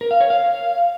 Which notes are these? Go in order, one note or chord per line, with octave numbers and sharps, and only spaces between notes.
A#4
F5
C#5
F5